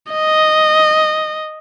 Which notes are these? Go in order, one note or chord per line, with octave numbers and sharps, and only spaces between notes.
D#5